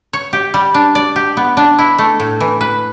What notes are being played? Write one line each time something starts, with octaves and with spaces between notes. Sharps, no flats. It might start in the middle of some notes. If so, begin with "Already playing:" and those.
C#5
G4
G3
D4
D5
G4
B3
D4
E4
A3
A2
E3
B4